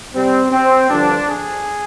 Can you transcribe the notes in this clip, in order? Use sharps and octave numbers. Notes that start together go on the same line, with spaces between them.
C3 G3 C4
C4
G2 D3 F3 D4
G#4